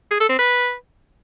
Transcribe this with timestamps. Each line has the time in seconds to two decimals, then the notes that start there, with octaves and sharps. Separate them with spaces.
0.11 G#4
0.20 A4
0.29 C4
0.39 B4